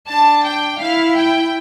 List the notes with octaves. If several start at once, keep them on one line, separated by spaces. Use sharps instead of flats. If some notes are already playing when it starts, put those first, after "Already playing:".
D4 A5
G5
E4 F5
G5